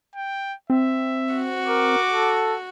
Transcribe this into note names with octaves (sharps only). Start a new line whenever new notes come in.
G5
C4 E5
F#4
A#4 D6
A4